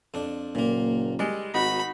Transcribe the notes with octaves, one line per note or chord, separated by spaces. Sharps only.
F2 D4
F#1 A#2 A#3
G3 G#3 D#5
G#1 D#4 F#4 B5